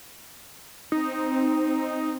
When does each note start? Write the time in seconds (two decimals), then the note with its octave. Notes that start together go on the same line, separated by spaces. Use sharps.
0.92 C4 D#4